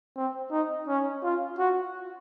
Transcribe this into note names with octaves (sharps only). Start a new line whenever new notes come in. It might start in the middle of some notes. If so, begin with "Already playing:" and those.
C4
D#4
C#4
F4
F#4